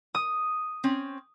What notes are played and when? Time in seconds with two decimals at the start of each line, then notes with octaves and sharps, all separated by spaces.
0.15 D#6
0.84 C4 C#4